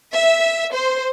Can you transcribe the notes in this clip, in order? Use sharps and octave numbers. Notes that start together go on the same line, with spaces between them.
E5
C5